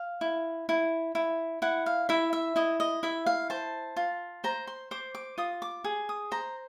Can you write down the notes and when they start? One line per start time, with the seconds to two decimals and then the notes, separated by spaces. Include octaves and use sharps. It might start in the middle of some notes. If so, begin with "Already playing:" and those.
Already playing: F5
0.21 E4
0.69 E4
1.15 E4
1.62 E4 F#5
1.86 F5
2.09 E4 E5
2.33 E5
2.56 E4 D#5
2.80 D#5
3.03 E4 E5
3.26 F5
3.50 C5 A5
3.97 F4
4.44 C5 A#5
4.67 C6
4.91 C5 D6
5.15 D6
5.38 F4 D#6
5.62 D6
5.84 G#4
6.09 D#6
6.32 C5 A#5